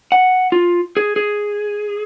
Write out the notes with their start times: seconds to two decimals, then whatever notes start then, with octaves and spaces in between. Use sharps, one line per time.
0.12 F#5
0.52 F4
0.97 G#4
1.16 G#4